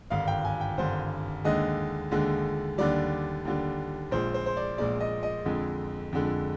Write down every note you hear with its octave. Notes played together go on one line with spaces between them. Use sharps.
G#1 G2 D3 F5
G5
G#5
G5
G#1 G2 D3 C5
D#2 D3 G#3 D#5
D#2 D3 G#3
D#2 D3 G3 D5
D#2 D3 G3
A#1 A#2 G#3 C5
C5
C5
D5
A#1 A#2 G#3 D5
D#5
D#5
F2 D3 G#3
F2 D3 G#3